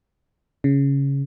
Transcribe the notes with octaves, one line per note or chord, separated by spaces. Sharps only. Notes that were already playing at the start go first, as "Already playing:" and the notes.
C#3